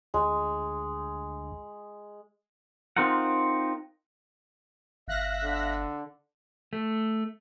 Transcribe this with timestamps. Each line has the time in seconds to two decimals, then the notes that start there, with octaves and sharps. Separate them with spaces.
0.14 D2 G#3
2.97 C4 D#4 F4 A#4 F#5
5.08 G1 E5 F5 F#6 A#6
5.43 D3
6.73 A3